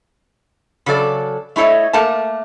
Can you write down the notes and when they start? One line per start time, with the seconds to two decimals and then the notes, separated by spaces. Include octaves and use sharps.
0.86 C#3 F#3 A4 D5
1.56 A3 E4 A4 C#5 D#5
1.93 A3 A#3 A#4 A5